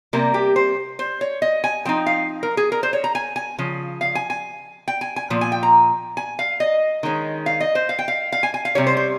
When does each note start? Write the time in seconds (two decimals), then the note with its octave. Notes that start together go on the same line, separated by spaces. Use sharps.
0.13 C3 G3 A#3 A#4
0.34 G4
0.56 C5
0.99 C5
1.21 C#5
1.42 D#5
1.64 G#5
1.85 F3 C4 D#4 G5
2.06 F5
2.43 A#4
2.57 G#4
2.72 A#4
2.83 C5
2.93 C#5
3.04 A#5
3.15 G#5
3.36 G#5
3.58 C#3 F3
4.01 F5
4.15 G#5
4.30 G#5
4.88 G5
5.01 G#5
5.16 G#5
5.30 A#2 F3
5.41 G#5
5.52 G5
5.63 A#5
6.17 G#5
6.39 F5
6.60 D#5
7.03 D#3 G#3 C#4
7.46 F5
7.60 D#5
7.75 C5
7.89 F5
7.99 G5
8.08 F5
8.32 F5
8.43 G#5
8.54 G#5
8.65 F5
8.75 C3 G3 C#4 C#5
8.87 C5
8.97 C5